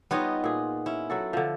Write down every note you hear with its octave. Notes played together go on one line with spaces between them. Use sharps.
G3 B3 D#4 F4 C#5 D#5
A#2 G#4
C#4 E4
F#3 F#4 A4
D3 F3